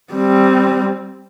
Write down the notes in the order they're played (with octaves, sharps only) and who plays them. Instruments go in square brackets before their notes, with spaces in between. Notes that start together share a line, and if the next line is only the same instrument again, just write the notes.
[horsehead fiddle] G3 C4